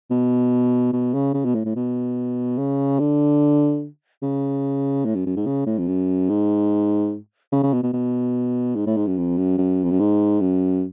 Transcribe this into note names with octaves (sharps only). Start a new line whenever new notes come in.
B2
B2
C#3
C#3
B2
A2
A2
B2
C#3
D3
C#3
A2
F#2
F#2
G#2
C#3
A2
F2
F#2
G#2
C#3
C#3
B2
B2
B2
G#2
A2
G#2
F#2
F2
F#2
F#2
F2
F#2
G#2
F#2